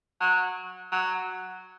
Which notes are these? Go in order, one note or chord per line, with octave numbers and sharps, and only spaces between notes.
F#3
F#3